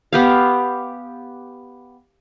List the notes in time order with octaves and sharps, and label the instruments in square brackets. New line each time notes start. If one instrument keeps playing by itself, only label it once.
[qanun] B3 G4 F5